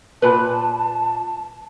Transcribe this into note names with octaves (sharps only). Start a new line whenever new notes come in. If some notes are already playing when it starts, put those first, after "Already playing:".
A#2 B4 A5